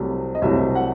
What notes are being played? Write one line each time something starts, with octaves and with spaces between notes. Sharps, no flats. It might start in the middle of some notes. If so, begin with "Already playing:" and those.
Already playing: C2 C3 F#3 A3
D#5
C2 C3 F#3 A3 E5
F#5